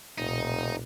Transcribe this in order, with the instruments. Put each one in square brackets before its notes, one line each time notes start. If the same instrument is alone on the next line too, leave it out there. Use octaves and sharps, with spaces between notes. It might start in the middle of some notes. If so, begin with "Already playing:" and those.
[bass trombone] F1 [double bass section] B1 A#2 [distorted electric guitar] D#4